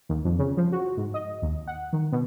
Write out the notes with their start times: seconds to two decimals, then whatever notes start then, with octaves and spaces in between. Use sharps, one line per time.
0.09 D#2
0.25 F2
0.39 C#3
0.57 F3
0.72 F#4
0.97 G#2
1.14 D#5
1.42 D#2
1.68 F#5
1.93 D#3
2.12 B2